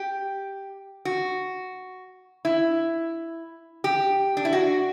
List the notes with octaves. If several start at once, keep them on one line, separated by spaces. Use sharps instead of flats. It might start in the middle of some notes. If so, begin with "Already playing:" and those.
Already playing: G4
F#4
E4
G4
D4
E4
F#4